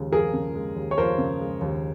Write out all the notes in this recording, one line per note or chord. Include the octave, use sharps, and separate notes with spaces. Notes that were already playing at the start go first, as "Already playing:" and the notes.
Already playing: D#2 C#3 F3 G#3
F3 G#4 A#4
C#3
G#3
D#2
C#5
F3 A#4 C5
C#3
G#3
D#2